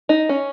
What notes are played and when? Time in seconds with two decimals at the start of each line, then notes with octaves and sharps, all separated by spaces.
0.09 D#4
0.29 C#4